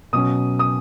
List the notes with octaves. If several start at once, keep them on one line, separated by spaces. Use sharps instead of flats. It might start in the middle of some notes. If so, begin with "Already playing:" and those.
B2 F#3 C#4 D#6
D#6